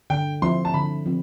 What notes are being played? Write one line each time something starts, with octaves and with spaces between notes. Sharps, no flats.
D3 G5
F3 C4 E4 C6
A5
D3 B5
F3 C4